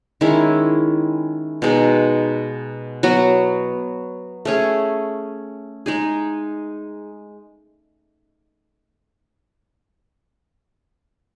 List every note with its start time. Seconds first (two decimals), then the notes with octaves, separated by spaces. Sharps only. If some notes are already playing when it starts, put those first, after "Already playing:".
0.21 D#3 G#3 C#4 E4
1.62 B2 G#3 D#4
3.03 F#3 B3 F#4
4.45 A3 C#4 G#4
5.86 G#3 D#4 G#4